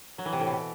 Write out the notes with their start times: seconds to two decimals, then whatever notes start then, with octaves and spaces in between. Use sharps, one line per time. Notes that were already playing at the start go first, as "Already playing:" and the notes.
0.18 F#3
0.25 E3
0.33 C3
0.40 A2
0.47 B2